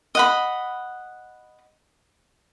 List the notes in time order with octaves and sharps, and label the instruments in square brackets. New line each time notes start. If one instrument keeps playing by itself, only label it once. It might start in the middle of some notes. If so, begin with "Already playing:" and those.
[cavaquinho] D#5 F#5 B5